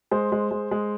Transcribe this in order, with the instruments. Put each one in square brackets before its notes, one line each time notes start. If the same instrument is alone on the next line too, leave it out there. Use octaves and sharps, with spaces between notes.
[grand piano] G#3 C5
G#3
G#3
G#3